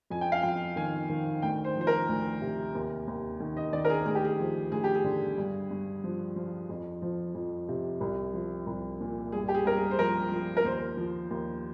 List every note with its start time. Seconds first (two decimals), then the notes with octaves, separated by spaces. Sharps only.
0.10 F2 G#5
0.21 G5
0.32 F5
0.43 F2 G5
0.76 D#3 G#5
1.09 D#3
1.42 D2 G5
1.64 C5
1.76 F3
1.81 C5
1.87 A#4
2.09 D2
2.41 C3
2.75 D#2
3.07 D#2
3.40 D#3
3.57 D#5
3.72 D#3 D5
3.85 A#4
3.90 G#4
4.06 D2 G#4
4.15 G4
4.25 G#4
4.39 F3
4.72 D2 G#4
4.84 G4
4.95 G#4
5.04 D3
5.38 G2
5.70 G2
6.04 F3
6.36 F3
6.69 F2
7.02 F3
7.35 F2
7.68 C3
8.01 C2
8.34 F3
8.66 C2
9.00 A#2
9.32 G2 G#4
9.48 G4
9.54 G#4
9.65 G2 A#4
9.77 G#4
9.91 C5
9.98 F3 A#4
10.32 F3
10.57 A#4
10.64 D#2 C5
10.97 F3
11.30 D#2